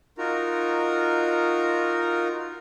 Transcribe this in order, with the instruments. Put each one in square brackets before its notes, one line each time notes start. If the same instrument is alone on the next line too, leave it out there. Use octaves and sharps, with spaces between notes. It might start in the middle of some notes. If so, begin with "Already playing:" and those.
[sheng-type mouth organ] D#4 F4 F#4 A#4 A#5